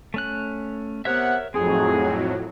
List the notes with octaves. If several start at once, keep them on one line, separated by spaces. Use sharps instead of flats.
A3 C#4 F#6
C3 B3 A#4 C#5 E5 F#5
F2 A2 F#3 C4 D#4 G#4